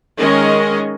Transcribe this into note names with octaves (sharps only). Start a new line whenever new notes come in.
D#3 G#3 C#4 A#4 D#5